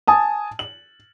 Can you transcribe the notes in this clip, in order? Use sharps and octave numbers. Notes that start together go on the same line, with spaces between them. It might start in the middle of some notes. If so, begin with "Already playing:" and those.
G#5 A5 D#6
F#7